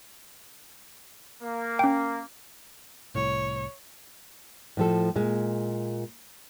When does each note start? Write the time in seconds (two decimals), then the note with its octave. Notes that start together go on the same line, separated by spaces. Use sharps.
1.42 A#3
1.79 C#4 G5
3.15 C2 A2 C#5
4.77 A2 F3 A4
5.16 A#2 G#3